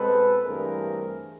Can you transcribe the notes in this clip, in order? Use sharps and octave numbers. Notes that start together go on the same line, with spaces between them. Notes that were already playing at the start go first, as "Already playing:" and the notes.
Already playing: B2 G#3 C4 A4 B4
G2 E3 A3 C4 G#4 A#4